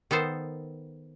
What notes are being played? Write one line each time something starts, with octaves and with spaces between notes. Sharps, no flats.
D#3 B3 A4 C5